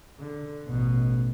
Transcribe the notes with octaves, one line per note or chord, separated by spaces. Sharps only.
D3
A1 B2